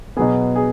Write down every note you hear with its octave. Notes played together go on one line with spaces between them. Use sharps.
B2 F#3 B3 G#4
G#4